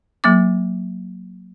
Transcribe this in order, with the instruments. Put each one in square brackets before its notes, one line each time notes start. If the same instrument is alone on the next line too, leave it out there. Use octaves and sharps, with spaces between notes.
[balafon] F#3 A#3 D6